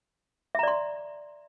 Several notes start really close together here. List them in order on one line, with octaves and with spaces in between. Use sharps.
E5 A#5 D5 C6